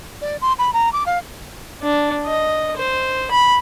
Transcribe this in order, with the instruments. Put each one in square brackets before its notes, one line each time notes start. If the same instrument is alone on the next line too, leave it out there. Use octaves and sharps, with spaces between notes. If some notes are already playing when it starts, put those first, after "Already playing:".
[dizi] D5
C6
B5
A#5
D6
F5
[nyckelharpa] D4
D#5
C5
B5